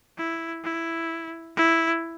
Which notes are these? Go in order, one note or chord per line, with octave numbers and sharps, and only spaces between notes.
E4
E4
E4